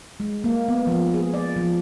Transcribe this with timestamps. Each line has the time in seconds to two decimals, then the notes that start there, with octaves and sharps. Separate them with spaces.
0.20 G#3
0.44 A#3
0.68 B3
0.87 F3
1.14 G#4
1.34 D5
1.56 F3